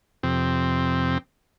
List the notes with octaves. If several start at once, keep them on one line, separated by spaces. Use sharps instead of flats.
F2 C3 C4